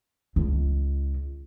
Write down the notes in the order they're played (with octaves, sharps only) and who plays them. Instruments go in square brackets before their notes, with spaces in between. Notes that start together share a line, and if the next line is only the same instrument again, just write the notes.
[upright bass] C#2